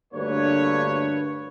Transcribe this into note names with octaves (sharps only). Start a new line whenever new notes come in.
D2 G2 A3 A#3 B4 C#5